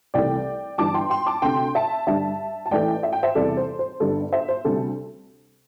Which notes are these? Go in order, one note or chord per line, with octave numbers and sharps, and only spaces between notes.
C2 C3 E3 A3 D5 G5
G1 G2 E3 G3 A5 D6
G5 C6
G5 C6
A5 D6
D2 C3 A3 G5 C6
E5 A5
G2 D3 G3 E5 A5
A5
A1 A2 E3 A3 D5 G5
E5
G5
C5 E5
E2 C3 G3 A4 D5
C5
C5
G1 G2 D3 G3 A4
C5 E5
C5
D2 C3 G3 A4